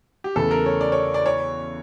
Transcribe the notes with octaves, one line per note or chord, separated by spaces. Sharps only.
G4
E2 C#3 E3 A3 A4
A#4
C#5
D5
C#5
D5
C#5